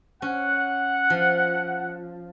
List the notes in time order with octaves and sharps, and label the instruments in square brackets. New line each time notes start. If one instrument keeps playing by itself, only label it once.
[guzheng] C#4 [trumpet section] F#5
[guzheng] F3